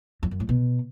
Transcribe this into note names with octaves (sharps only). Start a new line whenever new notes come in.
F2
F#2
A2
B2